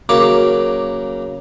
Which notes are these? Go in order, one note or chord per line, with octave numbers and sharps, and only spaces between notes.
C#3 F#3 A#3 D6